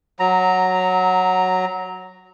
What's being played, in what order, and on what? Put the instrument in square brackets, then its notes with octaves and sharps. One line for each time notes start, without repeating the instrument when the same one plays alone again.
[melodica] F#3 A#5